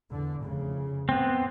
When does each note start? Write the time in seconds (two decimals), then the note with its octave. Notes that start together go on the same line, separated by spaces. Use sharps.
0.11 E2 D3
0.42 F1 C#3
1.09 A2 B3 C4